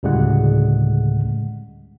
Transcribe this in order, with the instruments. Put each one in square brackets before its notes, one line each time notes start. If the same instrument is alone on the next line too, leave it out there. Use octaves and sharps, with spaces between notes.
[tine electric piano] D2 A2 C#3 G3 G#3 F#5